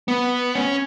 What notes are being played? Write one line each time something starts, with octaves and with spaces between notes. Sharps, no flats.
B3
C#4